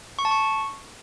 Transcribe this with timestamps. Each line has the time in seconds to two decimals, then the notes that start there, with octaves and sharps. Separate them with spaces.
0.19 C#6
0.25 A5
0.31 C#6